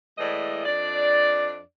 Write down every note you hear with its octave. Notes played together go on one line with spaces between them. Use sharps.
A2 E3 G#3 D5 D#5
F2 D4 D5